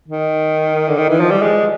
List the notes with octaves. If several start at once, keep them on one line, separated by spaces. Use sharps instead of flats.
D#3
D3
D#3
E3
F3
G3
G#3